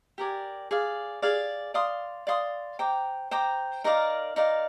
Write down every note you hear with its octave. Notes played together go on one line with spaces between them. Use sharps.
G4 A#4 D5 G#5
G#4 D5 F5
G#4 D5 F5
D5 F5 C6 D#6
D5 F5 C6 D#6
C5 G5 A#5 D6
C5 G5 A#5 D6
D#4 A#4 D5 F5
D#4 A#4 D5 F5